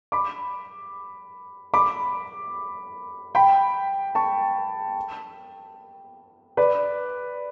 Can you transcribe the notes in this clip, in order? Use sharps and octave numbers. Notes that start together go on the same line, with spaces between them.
B5 D6
B5 D6
G5 B5
A5 C#6
B4 D5